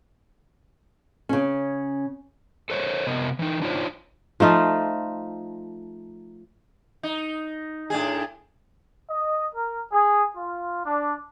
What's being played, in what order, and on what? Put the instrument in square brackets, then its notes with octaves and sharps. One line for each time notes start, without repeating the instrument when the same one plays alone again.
[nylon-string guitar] C#3 C#4
[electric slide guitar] A4 C5 C#5
C3 B3 A#4 D#5
E3 D#4
D4 D#4 F4 A4 C5 C#5
[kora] F3 A3 D#4 F4
[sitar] D#4
A2 D4 G#4
[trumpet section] D#5
A#4
G#4
F4
D4